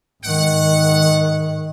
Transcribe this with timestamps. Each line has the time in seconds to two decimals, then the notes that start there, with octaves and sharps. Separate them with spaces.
0.23 G#2 D#3 F#5